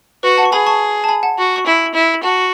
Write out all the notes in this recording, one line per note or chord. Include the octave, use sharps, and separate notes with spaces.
F#4 B4
F#5 A5
C#6
G#4 G#5 B5
A5 C#6
A5
G#5 B5
F#5 A5
F#4
C#6
E4 G#5 B5
E4
F#4 F#5 A5